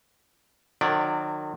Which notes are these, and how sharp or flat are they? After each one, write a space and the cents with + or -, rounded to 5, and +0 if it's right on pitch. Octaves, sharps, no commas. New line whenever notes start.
D#3 -40 F#3 -35 D5 -5